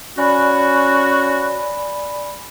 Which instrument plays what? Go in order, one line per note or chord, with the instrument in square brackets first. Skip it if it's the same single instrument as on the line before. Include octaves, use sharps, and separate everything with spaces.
[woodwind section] C#4 F#4 [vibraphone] D5 G#5 B5